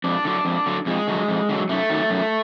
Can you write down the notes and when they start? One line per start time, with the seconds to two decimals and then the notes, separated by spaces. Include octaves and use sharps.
0.04 F2 D4
0.25 D3 F#3
0.45 F2
0.66 D3 F#3
0.86 F2 G#3
1.08 D3 F#3
1.28 F2
1.49 D3 F#3
1.69 F#2 A3
1.89 D#3 F#3
2.10 F#2